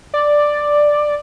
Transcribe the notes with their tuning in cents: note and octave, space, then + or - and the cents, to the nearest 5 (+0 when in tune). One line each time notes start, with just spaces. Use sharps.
D5 +5